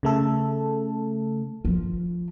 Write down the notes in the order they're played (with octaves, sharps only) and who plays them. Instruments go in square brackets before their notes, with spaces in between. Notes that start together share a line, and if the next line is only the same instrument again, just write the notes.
[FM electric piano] C#3 A3 A4
[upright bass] F3